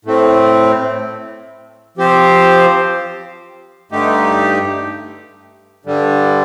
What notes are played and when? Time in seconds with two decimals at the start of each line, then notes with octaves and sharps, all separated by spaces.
0.05 A2 A3 C4
1.97 F3 C4 G4 C5
3.91 G2 D3 A3 D#4 G4
5.85 G2 D3 G3